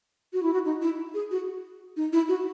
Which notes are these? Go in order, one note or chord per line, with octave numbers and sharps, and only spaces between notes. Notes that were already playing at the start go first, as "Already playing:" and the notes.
F#4
E4
F#4
D#4
E4
G#4
F#4
D#4
E4
F#4